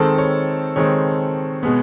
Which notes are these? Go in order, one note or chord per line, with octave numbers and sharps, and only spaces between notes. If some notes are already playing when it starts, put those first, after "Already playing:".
Already playing: D#3 G#3 C4 A4
C#5
D#3 G#3 C4 C#5
B2 G#3 B3